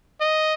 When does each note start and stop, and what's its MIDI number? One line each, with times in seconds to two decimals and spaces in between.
0.21 0.54 75